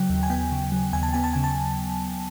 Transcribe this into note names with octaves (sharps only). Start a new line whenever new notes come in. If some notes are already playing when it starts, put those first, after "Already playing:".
Already playing: C#3 F#3 G5
D#2
G#5
B3 G5
C#3
F#3
D#2 G#5
A5
B3 G#5
A5
C#3 G#5
A5